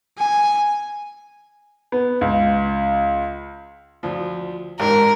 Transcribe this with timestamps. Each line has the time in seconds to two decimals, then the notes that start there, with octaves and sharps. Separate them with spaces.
0.18 G#5
1.92 B3
2.21 C#2
4.03 D2 F3
4.80 A1 G#2 A#4